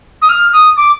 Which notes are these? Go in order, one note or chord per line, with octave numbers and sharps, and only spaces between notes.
D#6
F6
D#6
D6